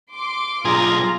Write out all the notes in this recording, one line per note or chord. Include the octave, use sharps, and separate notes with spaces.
C6 D6
B1 F4 G#4 A#5